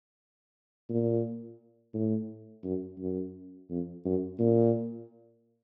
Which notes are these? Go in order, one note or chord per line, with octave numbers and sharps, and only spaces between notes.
A#2
A2
F#2
F#2
F2
F#2
A#2